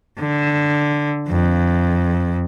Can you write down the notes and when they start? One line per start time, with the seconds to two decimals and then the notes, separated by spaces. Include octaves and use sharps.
0.19 D3
1.28 F2